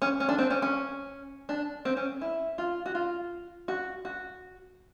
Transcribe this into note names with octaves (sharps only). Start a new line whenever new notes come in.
C#4
C#4
D4
C4
C#4
C#4
D4
C4
C#4
E4
F4
F#4
F4
F#4
F#4